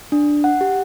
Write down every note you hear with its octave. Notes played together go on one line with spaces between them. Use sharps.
D4
F#5
G4